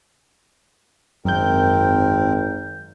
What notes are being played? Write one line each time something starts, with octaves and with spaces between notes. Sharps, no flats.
G#1 F#2 C4 A#4 G6